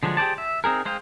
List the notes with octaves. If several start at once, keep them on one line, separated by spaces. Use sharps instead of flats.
D3 F3 F#3 G#3 D4
G4 G#4 C5 D5 A5
E5
C4 D#4 G#4 A#4
G#3 C5 D#5 F5 G5